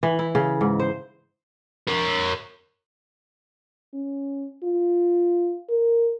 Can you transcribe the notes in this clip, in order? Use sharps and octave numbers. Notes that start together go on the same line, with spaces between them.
E3
E4
C#3
G#2
C5
A#4 C#5
C#4
F4
A#4